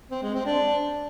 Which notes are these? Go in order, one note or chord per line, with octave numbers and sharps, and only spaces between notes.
C4
G#3
C4
D4